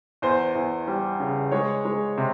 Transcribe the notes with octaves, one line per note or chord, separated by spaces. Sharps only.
E2 C5
E2
G3
C#3
G#3 C#5
G#3
C3